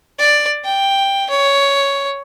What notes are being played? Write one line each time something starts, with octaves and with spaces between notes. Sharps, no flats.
D5
G5
C#5